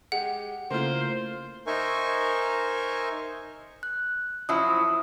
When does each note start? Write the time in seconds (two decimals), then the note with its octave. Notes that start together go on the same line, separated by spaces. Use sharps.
0.12 G#3 G4 F#5
0.71 C#3 A3 A#3 E4 F4 C5
1.67 D#4 A#4 C5 E5 G#5 C#6
3.83 F#6
4.49 F3 F#3 E4 D#6